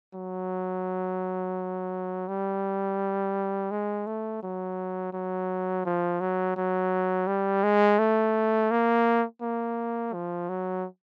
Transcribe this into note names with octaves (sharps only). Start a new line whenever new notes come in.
F#3
G3
G#3
A3
F#3
F#3
F3
F#3
F#3
G3
G#3
A3
A#3
A#3
F3
F#3